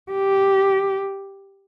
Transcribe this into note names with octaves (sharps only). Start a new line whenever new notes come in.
G4